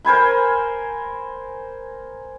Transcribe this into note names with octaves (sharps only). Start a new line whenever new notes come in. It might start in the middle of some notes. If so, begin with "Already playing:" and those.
A#4 C5 G#5 B5